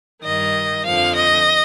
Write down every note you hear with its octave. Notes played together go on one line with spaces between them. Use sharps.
G2 D#3 D#5
F2 D3 F3 F5
D#5